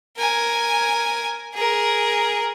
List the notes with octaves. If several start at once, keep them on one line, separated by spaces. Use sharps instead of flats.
A#4 G#5
G#4 A#4